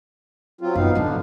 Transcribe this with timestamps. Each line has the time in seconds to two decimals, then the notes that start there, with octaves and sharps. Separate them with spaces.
0.61 F#3 C4 F4
0.75 F#2 B3 D#4 F5
0.95 A2 D3 F#3 D4